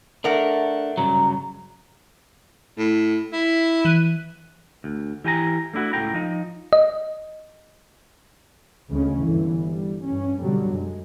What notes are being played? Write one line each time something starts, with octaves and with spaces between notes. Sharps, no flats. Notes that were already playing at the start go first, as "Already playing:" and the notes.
A3 D4 A#4 F#5
G2 C#3 F#3 A#5
A2
E4
E3 F#6 D#7
D2
E3 G4 G#5 A#5
A3 D4 E4 F#4
C#2 A2 G5 A#5
F3 D#4
D#5
D2 C#3 G#3 C#4
G1 D3 E3
G3
G2 C#4
B2 D3 F#3 G3
F#2 G#3